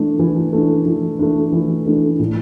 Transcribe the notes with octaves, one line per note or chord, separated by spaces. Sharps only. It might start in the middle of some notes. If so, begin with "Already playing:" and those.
Already playing: E3 A3 D4
E3
A3 D4
E3
A3 D4
E3
A3 D4
A2